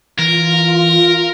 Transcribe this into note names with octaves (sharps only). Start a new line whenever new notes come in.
E3 F4 A#4